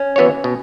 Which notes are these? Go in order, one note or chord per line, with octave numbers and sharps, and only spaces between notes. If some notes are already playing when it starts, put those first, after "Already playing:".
Already playing: C#4
E3 B3 F#4 C#5
B2